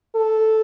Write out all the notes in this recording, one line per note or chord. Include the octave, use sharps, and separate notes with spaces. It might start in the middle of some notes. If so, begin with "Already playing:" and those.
A4